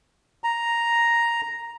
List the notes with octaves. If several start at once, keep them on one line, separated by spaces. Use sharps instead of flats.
A#5